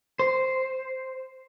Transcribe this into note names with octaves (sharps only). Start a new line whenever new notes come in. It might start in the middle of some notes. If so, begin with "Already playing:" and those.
C5